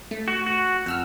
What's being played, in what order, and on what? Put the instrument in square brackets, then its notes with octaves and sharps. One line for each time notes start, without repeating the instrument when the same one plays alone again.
[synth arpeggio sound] A3
[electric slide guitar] F#4
F#4
[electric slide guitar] F2 [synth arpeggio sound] F#5 E6 F6